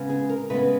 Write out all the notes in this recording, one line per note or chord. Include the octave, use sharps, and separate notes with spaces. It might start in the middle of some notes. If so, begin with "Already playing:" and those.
Already playing: C#3 G#3 B3
G#4
A#4
C#3 G#3 B3 B4